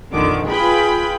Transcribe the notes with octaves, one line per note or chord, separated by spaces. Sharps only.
A#1 F2 D3 D#3 D6
F4 G#4 B4 G5 B5